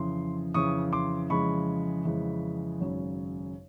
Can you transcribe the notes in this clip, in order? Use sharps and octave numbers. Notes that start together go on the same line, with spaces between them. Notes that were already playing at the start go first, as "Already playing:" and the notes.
Already playing: F2 C#3 E3 C6
F2 C#3 E3 C#6 D#6
C6 D6
F2 C#3 E3 G#3 B5 C#6
F2 C#3 E3 G#3
G#1 F#2 C#3 F#3